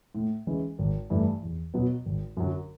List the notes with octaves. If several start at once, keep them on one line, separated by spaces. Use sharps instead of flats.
A2
E3 G#3 C#4
G#1
G2 E3 A3
E2
B2 F#3 B3
G#1
F#2 D3 F#3